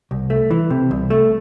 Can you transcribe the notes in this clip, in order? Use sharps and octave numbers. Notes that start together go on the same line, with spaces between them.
C2
A3
E3
C3
C2
A3